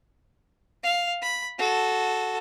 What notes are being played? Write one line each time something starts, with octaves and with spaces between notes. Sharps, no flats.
F5
B5
F#4 A4